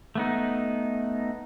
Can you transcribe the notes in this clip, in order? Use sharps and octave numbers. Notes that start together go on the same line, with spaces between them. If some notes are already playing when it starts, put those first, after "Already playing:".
A3 B3 D#4